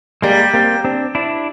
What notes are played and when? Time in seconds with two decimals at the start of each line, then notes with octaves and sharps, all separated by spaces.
0.22 G3 G#3 A#3
0.54 A#3 C4
0.85 C4 D4
1.15 D4 E4